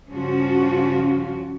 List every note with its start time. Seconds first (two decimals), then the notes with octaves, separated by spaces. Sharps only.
0.11 G2 C#3 F3 C#4 F4 F#4